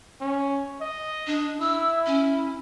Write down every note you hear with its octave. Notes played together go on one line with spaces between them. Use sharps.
C#4
D#5
D4
E4 E6
C#4